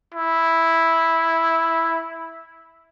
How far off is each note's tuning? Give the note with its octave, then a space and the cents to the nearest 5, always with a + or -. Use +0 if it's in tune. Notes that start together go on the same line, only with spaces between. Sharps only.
E4 -5